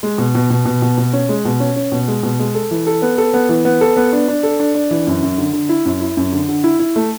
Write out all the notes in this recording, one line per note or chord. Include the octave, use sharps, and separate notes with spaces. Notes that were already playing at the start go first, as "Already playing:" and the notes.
G#3
B2
B2
B2
B2
B2
B2
C#4
G#3
B2
C#4
C#4
B2
G#3
B2
G#3
A4
E3
A4
B3
A4
B3
E3
B3
A4
B3
D4
D4
A4
D4
D4
E3
F#2
F#2
D3
D3
E4
F#2
E4
F#2
D3
D3
E4
E4
A3